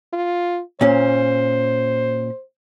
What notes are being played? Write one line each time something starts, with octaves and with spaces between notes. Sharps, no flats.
F4
A#2 C#4 C5